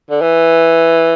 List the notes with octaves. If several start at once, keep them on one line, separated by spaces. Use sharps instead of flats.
D3
E3